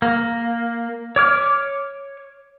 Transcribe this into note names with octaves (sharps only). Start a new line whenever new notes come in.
A#3
C#5 D6 F6